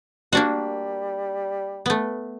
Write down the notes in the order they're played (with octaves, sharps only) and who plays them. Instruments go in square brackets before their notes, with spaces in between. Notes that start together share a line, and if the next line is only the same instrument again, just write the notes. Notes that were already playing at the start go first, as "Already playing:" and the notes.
[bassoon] G3 [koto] A#3 D4 F#4
[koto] A3 B3